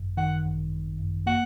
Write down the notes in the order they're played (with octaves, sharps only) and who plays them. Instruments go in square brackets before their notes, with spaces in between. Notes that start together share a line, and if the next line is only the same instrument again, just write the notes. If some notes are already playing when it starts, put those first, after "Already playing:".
Already playing: [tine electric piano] G#1 F#2
[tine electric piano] D#3 [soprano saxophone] F#5
[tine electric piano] G#1
G#1
F#2
[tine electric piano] A#3 [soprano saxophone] F#5